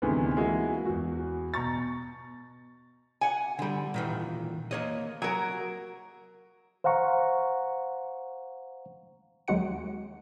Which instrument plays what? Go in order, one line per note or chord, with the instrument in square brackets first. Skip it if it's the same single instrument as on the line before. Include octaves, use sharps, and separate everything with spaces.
[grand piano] D2 C3 D#3 E3 G#3 B3
E3 G#3 A#3 E4 F#4
E2 F#4
B2 A#5 C#6 A6
[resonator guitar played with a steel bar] F#5 G#5
[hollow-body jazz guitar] D3 G3
A#2 D#3 E3
A#3 C#5 D#5
[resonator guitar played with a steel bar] F#3 A#4 [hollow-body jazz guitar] G#5
[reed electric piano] C5 F5 F#5 A#5 C#6
[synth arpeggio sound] D#2 F#3 G#3 F#4 F#5 C#7